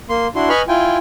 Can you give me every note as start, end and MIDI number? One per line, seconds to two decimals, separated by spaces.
0.09 0.27 58
0.09 0.27 84
0.36 0.49 62
0.36 0.49 64
0.36 0.49 66
0.36 0.49 84
0.49 0.62 71
0.49 0.62 75
0.49 0.62 80
0.49 0.62 83
0.49 0.62 85
0.49 0.62 89
0.68 0.98 64
0.68 0.98 65
0.68 0.98 79
0.68 0.98 80